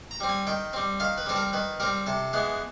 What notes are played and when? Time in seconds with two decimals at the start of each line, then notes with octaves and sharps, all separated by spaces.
0.11 A#5
0.20 G3 C4
0.29 G#5
0.47 D#3 G5
0.73 G3 C4
1.00 D#3 F5
1.18 B4
1.26 G3 C4 A4
1.36 A#4
1.53 D#3 B4
1.80 G3 C4 A#4
2.06 C3 A4
2.33 E3 G#3 B3